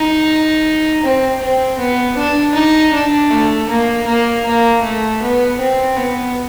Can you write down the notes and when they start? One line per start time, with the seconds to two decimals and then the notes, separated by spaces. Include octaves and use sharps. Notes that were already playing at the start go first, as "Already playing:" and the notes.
Already playing: D#4
1.03 C4
1.40 C4
1.78 B3
2.17 D4
2.55 D#4
2.93 D4
3.30 A3
3.69 A#3
4.06 A#3
4.45 A#3
4.82 A3
5.21 B3
5.59 C4
5.96 B3